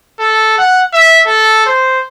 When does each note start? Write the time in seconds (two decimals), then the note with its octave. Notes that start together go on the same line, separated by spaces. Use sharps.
0.20 A4
0.58 F#5
0.93 E5
1.26 A4
1.66 C5